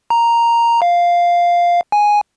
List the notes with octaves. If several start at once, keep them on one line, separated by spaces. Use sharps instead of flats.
A#5
F5
G#5